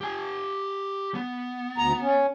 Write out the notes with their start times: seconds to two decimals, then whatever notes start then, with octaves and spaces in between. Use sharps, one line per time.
0.01 G4 G#5
1.15 B3
1.78 D2 A#5
2.01 C#4